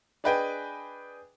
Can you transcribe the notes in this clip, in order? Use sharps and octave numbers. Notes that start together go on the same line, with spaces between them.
D4 G#4 B4 D#5 G5 G#5